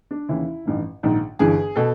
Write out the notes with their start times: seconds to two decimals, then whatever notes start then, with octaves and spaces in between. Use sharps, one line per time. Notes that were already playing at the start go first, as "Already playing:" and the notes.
0.11 D4
0.29 D#2 C#3 E3 E4
0.65 A1 G2 D#3
1.03 A#1 G#2 D#3
1.39 G1 G2 E3 G#4
1.76 B2 A4